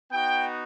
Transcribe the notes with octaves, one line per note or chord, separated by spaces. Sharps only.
B3 D#4 F#4 G5